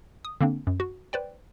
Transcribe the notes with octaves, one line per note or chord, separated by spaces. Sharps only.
D#6
D3 A#3 C4 D4
F#2
F#4
B4 C5 D5 G5